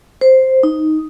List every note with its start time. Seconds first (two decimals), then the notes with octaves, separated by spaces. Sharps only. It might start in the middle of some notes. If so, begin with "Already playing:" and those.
0.21 C5
0.63 D#4